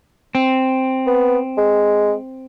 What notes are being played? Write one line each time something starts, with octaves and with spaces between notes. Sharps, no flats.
C4
B3
G#3